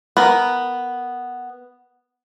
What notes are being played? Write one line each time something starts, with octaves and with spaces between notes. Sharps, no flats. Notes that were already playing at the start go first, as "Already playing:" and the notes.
B3 A#4